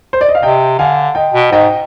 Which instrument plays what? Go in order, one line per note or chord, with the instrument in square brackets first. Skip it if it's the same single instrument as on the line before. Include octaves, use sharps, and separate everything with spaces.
[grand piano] C5
D5
D#5
F5
[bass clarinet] C3 [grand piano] D#5 G5
[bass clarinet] D3 [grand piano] F5 G#5
[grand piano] D#5 G5
[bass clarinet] B2
[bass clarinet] G#2 [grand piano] D#5 G5